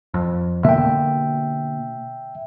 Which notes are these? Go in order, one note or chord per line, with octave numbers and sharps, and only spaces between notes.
F2
B2 D3 A#3 E5 G5